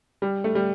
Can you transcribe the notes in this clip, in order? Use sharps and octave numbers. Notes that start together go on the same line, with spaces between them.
G3
A3
G3